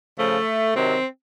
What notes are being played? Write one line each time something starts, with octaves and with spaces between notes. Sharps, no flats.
C#3 F3 A3
C3 D#3 F#3 C4